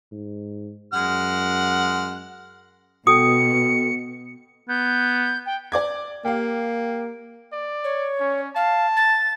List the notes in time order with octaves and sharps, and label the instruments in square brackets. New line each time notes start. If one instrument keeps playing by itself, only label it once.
[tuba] G#2
[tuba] F#2 [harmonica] G#3 F6 [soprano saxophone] F#5
[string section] B2 [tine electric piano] F#4 A4 G5 [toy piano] D#6 [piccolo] C#7
[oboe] B3 [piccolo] G6
[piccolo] G5
[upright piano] D5 D6 G#6
[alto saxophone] A#3 [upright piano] G4 F5
[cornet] D5
[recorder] C#5
[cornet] C#4
[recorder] F5 [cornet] A5
[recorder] A6